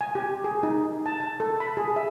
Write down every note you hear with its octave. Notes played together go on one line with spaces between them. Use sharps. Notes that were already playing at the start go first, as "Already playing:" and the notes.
G#5
G4
G#4
D#4
A5
A5
A4
B5
G#4
E5